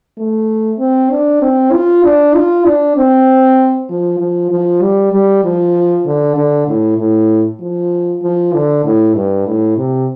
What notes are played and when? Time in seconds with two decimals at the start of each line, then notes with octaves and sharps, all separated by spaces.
0.18 A3
0.79 C4
1.10 D4
1.42 C4
1.73 F4
2.04 D4
2.35 F4
2.65 D4
2.97 C4
3.90 F3
4.20 F3
4.51 F3
4.82 G3
5.12 G3
5.44 F3
6.06 D3
6.36 D3
6.68 A2
6.98 A2
7.61 F3
8.22 F3
8.53 D3
8.84 A2
9.15 G2
9.46 A2
9.78 C3